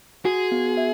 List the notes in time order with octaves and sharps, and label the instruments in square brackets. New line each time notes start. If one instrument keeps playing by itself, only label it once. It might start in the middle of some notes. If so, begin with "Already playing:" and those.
[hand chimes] F#4 [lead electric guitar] G#4
[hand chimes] B3
E5